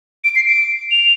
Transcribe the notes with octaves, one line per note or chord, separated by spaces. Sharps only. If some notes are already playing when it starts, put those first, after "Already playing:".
D7
C7
D7
F7